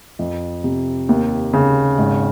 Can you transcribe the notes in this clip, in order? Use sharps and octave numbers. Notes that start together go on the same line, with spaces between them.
F2
C3
D#2
C#3
G#1